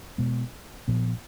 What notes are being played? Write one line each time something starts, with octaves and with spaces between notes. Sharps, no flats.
B2 G#3 B3
A#2 F3 B3